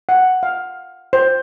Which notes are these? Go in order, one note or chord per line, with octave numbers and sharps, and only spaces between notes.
F#5
F5
C5